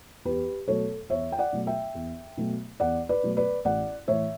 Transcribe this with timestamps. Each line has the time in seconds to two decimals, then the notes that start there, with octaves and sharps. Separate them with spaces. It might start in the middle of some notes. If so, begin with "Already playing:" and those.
0.25 E2 G4 B4
0.68 B2 F#3 A3 A4 C#5
1.10 E2 C#5 E5
1.32 G5
1.39 D5 F#5
1.53 B2 F#3 A3
1.67 E5 G5
1.95 E2
2.37 B2 F#3 A3
2.80 E2 D5 F#5
3.09 B4 D5
3.23 B2 F#3 A3
3.37 B4 D5
3.65 A1 D5 F#5
4.08 A2 E3 C#5 E5